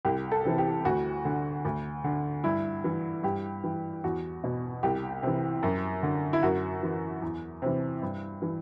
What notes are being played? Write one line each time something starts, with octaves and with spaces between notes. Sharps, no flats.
C2 G4
A4
C3 E3
G4
D2 F#4
D3
D2
D3
G2 E4
E3
G2 G4
E3
E2 F#4
B2
C2 G4
C3 E3
F#2
D3
E4
F#2 F#4
E3
E2
C3 E3
G2
E3